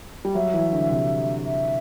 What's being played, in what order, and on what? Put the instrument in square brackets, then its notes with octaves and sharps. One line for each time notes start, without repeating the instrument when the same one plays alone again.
[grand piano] G3
[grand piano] F#3 [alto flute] E5
[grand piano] E3
D3
C3
[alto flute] E5